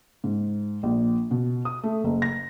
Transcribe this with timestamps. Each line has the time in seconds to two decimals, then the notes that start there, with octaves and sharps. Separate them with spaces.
0.24 G#2
0.83 A#1
1.31 B2
1.65 D#6
1.83 A3
2.04 F#1
2.22 A#6